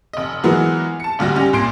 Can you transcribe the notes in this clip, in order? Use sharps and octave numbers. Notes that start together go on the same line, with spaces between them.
F1 D#5
E3 F#3 G#3 B3 F#4 A#4
A5 C#7
F1 D2 G3 F#4 A#6
C#4 G4
C2 A#2 C6 C7 D7